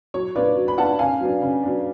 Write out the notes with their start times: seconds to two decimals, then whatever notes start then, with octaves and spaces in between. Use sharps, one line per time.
0.14 F#3 C#5
0.35 B3 D4 F4 B4 D5
0.56 F#3
0.68 B5
0.78 B3 D4 F4 F#5 A5
0.99 C#3 F5 G#5
1.21 F#3 B3 D4
1.41 C#3
1.63 F#3 B3 D4